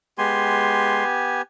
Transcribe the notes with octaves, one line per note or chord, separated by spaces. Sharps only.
G#3 B3 G4 G#5 C6